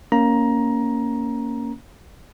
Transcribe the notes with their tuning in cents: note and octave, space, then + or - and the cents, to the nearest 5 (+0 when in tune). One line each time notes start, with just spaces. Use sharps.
A#3 +0 C#4 +0 A#5 +15